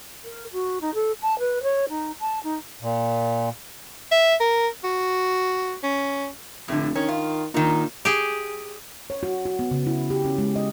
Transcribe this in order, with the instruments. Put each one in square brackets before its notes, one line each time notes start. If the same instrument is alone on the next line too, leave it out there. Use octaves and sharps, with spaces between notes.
[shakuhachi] A#4
F#4
D#4
A4
A5
B4
C#5
D#4
A5
D#4
[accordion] A#2
[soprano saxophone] E5
A#4
F#4
C#4
[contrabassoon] F1 [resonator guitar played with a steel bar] A2 D3
[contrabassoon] D#3 [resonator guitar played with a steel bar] C#4
[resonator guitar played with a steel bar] F4
[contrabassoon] A#2 [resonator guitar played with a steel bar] D#3 D#4
[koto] G4 G#4
[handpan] C#5
F#4
F#4
B3
C#3
E4
G4
C#4
G#3
D#5